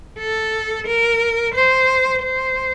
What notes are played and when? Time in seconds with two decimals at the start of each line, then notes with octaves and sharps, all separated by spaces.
0.19 A4
0.87 A#4
1.54 C5
2.22 C5